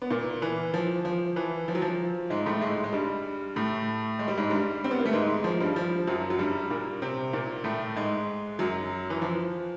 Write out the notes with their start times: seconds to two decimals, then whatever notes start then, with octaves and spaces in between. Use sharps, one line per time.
0.02 B3
0.10 A#2 A#3
0.42 E3
0.74 F3
1.05 F3
1.36 E3
1.68 F3
1.75 F#3
1.82 F3
2.30 G#2 G#3
2.46 A2 A3
2.62 G#2 G#3
2.84 G#3
2.93 G2 G3
3.56 A2 A3
4.19 G#3
4.28 G3
4.38 G#2 G#3
4.50 G2 G3
4.84 C4
4.91 B3
4.99 A#3
5.06 A3
5.13 G#2 G#3
5.44 F3
5.61 G2 G3
5.76 F3
6.07 F#2 F#3
6.30 F#3
6.39 G2 G3
6.70 A#2 A#3
7.02 C3 C4
7.33 A#2 A#3
7.64 A2 A3
7.96 G#2 G#3
8.59 F#2 F#3
9.10 E3
9.22 F3